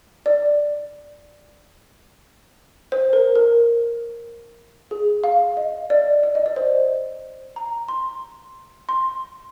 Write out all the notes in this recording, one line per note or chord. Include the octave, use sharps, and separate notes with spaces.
D5
C5
A#4
A#4
G#4
F5
D#5
D5
D5
D#5
D5
C5
A#5
C6
C6